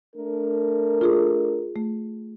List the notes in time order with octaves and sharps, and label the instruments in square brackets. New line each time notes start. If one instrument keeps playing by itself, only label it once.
[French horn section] A3 D4 A#4
[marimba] F4 G#4
A3